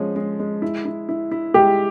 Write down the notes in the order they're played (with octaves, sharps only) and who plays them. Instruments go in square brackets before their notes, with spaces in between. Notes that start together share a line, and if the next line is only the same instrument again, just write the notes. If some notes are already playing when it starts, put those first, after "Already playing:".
Already playing: [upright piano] F3 G#3 C#4
G#3
G#3
E4
E4
E4
E4
[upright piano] G#3 [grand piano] G4